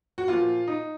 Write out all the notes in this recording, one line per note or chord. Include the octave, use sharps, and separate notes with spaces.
F#4
A#2 F3 F4
D#4